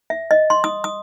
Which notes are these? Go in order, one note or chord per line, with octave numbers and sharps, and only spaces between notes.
E5
D#5
C6
D#6
D#6